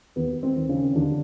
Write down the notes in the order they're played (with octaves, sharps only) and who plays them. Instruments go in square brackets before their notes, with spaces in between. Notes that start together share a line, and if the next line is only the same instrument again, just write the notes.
[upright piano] D#2 B3
C4
D#3
C#3 C#4
D#2 D3 D4